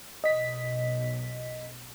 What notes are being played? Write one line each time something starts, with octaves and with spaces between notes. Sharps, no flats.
B1 D#5 B6